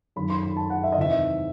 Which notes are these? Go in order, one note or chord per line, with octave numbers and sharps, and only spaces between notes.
F#2 D#3 B5
C6
B5
A5
F#5
E5
D#5
E2 C3 D#3 E5